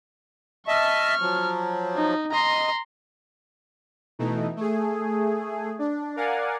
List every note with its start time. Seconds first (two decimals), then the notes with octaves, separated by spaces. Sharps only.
0.68 D#5 E5 A5 C#6 F6
1.19 F3 F#3
1.96 D#4
2.31 D#5 A#5 C6
4.19 B2 E3 A3 D#4
4.56 A3 G#4
5.79 D4
6.16 A#4 D5 F5 F#5 G#5